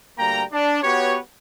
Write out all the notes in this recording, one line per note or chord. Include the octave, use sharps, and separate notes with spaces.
D2 G3 A#3 G5 A#5
D4
B3 F#4 G4 B4 C#5